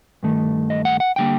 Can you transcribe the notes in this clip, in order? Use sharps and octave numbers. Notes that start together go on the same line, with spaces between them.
G2 D#3 A3
D#5
F#5
F#5
D3 G3 A#3 G5